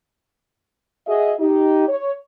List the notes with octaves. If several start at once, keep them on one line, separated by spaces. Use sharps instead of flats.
F#4 G#4 D#5 E5
D#4 G4
C#5